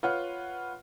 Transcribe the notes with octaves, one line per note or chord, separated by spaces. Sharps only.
F4 B4 C#5 F#5 F6